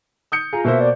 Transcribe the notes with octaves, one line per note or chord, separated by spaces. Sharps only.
D#6 G6 C#7
F4 G#4 A#5
B2 A#3 C5 E5
D5